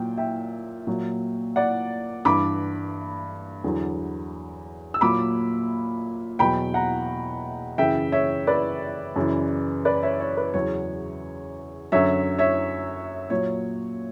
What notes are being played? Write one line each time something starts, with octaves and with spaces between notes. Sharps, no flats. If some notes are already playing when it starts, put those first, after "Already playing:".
Already playing: A#2 F#3 G5
E5 G5
A#2 F#3
D5 F#5
G2 E3 B5 D6
E2 D3 F#3
E6
A#2 F#3 B5 D6
E2 B2 F#3 G5 B5
F#5 A#5
F#2 C#3 E3 E5 G5
C#5 E5
B4 D5
F#2 C#3 E3
B4 D5
C#5 E5
C#5
B4
E2 C#3 F#3 C#5
F#2 D3 F#3 C#5 E5
C#5 E5
A#2 F#3 C#5